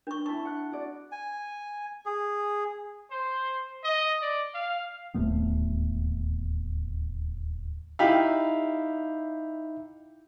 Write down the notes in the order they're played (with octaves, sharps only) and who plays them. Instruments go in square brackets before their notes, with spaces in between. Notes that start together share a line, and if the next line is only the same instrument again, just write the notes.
[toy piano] D4 C#6
[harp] E4 A5 [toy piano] C#6
[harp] F#5 F#6
F#4 D5
[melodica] G#5
G#4
[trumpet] C5
D#5
D5
F5
[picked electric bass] D1 D#2 A3 B3
[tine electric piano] D#4 E5 B5 [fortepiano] E4 G4 F5